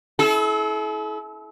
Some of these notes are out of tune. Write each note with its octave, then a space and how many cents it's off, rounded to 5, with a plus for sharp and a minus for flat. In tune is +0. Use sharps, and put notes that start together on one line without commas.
E4 -20 A4 -45